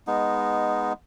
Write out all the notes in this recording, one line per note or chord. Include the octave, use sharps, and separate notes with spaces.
G#3 B3 D#4